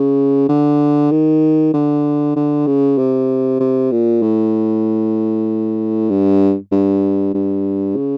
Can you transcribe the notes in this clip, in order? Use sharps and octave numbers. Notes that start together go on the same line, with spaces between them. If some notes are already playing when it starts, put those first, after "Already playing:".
Already playing: C#3
D3
D#3
D3
D3
C#3
C3
C3
A#2
A2
G2
G2
G2
C#3